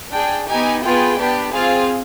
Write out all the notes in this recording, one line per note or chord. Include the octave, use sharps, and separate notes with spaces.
D4 G#4 G5
B3 D#4 G4 G#5
B3 F4 G#4 G5
B3 D4 G4
C4 F4 G#4 F5